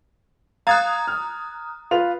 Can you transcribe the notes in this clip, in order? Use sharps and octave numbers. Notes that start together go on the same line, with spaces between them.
F5 A#5 D#6 F#6 G#6 A6
F6
F4 B4 F7